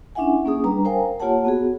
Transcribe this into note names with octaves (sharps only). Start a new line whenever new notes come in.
C#4 D4 E4 E5 F#5 G#5
A#3 C#4 G#4 D#6
G3 D4 B4 A#5
A#4 C5 F5 G5 G#5
A#3 F4 G4 C#5 F#5 A5
B3 F#4 G#4